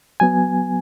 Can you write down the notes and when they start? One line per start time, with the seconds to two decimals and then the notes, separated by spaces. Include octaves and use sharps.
0.20 F#3 B3 G#5